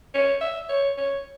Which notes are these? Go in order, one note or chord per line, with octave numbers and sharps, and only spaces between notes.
C#5
E5
C#5
C#5